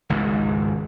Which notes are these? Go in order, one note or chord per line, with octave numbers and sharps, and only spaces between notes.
G#1 C#2 G#2